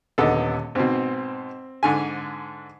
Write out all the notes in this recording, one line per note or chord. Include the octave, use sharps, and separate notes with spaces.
D#1 D3 B3 A4 D#5
G#2 B2 C4
G#2 D3 G#5